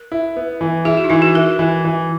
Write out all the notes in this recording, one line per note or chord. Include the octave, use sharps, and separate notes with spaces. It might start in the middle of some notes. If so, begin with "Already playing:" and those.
Already playing: A#4
E4
B3
E3
E4 G#4
F#4
D#4
E3 E4
F#4
E4 A#4
E3
E3